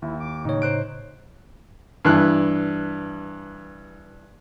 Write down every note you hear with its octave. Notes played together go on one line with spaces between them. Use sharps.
D#2 E4
D6
A2 C#3 D#4 C#5
C5 F#6 D7
G2 E3 F#6